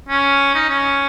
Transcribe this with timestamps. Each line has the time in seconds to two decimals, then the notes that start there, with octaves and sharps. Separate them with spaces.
0.09 C#4
0.55 D#4
0.69 C#4